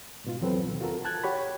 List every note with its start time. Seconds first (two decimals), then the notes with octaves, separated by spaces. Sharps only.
0.24 G#2 B2 F4
0.41 E2 F#3 C4 A4 B4
0.66 D#2 B2
0.81 F4 F#4 A4 A#4
1.05 A5 F#6 G#6
1.24 F#4 G4 C#5 F#5 B5